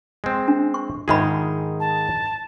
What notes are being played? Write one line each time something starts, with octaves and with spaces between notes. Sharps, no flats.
G#3 C4
D4
C#6
G#2 D#3 F4 G#4 E5 B5
A5